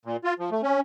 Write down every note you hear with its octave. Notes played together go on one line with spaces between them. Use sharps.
A#2
F4
F3
A3
C#4